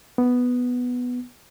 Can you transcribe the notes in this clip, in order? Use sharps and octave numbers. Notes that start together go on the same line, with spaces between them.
B3